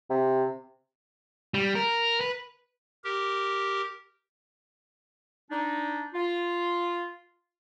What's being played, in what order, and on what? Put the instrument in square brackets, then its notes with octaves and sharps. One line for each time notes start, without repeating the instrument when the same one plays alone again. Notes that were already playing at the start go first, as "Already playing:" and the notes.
[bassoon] C3
[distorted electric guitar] G3
A#4
B4
[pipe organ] G4 A#4
[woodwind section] D4 D#4
F4